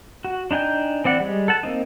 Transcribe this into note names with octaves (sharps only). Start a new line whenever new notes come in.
F#4
D4 D#4 G5 G#5 G6
E3 C4 D5 F#5
G3 G#3
A4 F#5 A5
A#3 C4 D#4